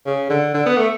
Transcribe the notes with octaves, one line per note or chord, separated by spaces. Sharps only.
C#3
D3
D3
B3
A3